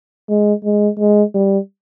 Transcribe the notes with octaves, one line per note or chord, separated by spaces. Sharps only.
G#3
G#3
G#3
G3